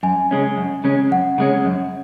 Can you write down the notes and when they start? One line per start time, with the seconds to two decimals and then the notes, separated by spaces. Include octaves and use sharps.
0.03 F#2 G#5
0.31 C#3 G#3 C#4
0.57 F#2
0.84 C#3 G#3 C#4
1.11 F#2 F#5
1.38 C#3 G#3 C#4
1.65 F#2